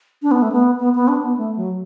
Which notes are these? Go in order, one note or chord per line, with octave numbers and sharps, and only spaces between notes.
D4
B3
A3
B3
B3
B3
D4
B3
A3
F#3